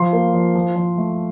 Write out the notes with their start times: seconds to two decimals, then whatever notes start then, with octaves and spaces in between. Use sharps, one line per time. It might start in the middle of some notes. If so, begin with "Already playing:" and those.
Already playing: F3 C6
0.13 A#3
0.34 F3
0.55 F3
0.76 F3
0.98 A3